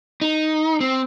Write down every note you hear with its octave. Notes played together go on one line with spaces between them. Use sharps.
D#4
C4